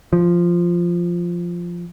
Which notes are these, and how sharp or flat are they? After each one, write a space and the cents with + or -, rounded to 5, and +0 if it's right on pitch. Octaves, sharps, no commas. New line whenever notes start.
F3 -5